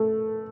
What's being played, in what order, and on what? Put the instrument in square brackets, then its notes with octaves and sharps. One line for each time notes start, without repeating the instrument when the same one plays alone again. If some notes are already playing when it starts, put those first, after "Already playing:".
Already playing: [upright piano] A3